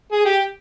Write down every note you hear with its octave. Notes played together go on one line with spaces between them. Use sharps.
G#4
G4